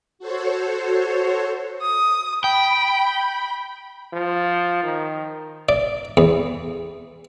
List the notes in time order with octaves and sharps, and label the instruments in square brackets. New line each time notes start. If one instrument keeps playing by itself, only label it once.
[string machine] F#4 A4 C5 C#5
[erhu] D#6
[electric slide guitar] G5 [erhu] B5
[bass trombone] F3
D#3
[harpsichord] D5
E2